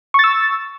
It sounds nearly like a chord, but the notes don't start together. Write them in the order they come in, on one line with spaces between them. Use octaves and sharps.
C#6 A6 E6